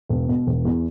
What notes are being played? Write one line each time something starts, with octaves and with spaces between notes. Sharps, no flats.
E1
B2
E1
E2